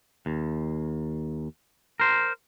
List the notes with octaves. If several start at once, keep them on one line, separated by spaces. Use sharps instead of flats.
D#2
A#4 C5